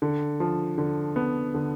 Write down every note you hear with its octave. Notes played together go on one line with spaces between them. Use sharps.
D3
F3
D3
B3
D3